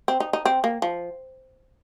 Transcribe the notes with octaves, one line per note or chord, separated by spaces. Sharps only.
C4
D#4
D#4
C4
A#3
F3